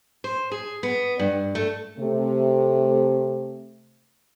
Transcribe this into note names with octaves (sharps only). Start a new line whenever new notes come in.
C5
G#4
B3
G2
A3
C3 A3